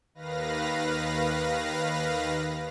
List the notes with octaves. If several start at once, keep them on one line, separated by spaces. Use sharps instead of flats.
D#2 D#3 B4 F5 A#6